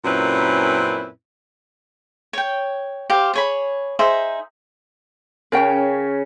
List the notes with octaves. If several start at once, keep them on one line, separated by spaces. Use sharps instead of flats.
F#2 A#2 C4 C#4 E4 B4
C#5 G5
G4 C5 F5
G#4 C#5 B5
D#4 G#4 C5 E5
C#3 C#4 A#4 C#5 G5